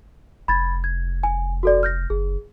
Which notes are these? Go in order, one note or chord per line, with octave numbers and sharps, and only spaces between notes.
F1 B5 G#6 A6
G#6
G#5
F#4 A4 D5
F6 G6 A#6
F#1 G#4